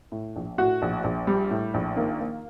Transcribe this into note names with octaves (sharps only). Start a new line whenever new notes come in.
A2
A#1
A2 F#4
A#1
A#1
G3
A2
A#1
D#3 A#3
A#3